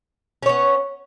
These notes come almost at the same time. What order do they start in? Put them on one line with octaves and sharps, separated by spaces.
C#4 C#5 B3